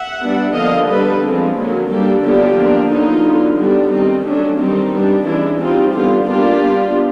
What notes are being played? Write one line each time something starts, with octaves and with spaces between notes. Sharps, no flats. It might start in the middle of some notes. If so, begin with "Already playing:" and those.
Already playing: E5 F#5
G3 B3 D4
D3 F3 A#3 D#5 F5
D3 G3 B3 D4 A4 B4
F3 G#3 C4
D3 F#3 A#3 C#4
G3 A#3 D4 G4 A4
D3 F#3 B3 D4 F4 G4
F3 A#3 D4
D3 F#3 B3 D#4 F4
D3 F#3 B3
G3 B3 D4
D#3 G3 C4 D#4
F#3 A3 C#4 D4
D#3 G3 C4 D#4
G3 B3 D4
E3 G#3 C#4 D4 E4
G3 C4 D#4 F4
D3 G3 B3 F4 G4
G3 A#3 D4 F4 G4
G3 B3 D4